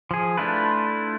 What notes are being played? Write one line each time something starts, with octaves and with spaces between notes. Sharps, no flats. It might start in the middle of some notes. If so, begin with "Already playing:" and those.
F3 G#4
A3 D4 E4 F4 B4